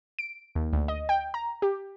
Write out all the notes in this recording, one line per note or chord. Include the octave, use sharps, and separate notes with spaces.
D7
D#2
D2
D#5
G5
A#5
G4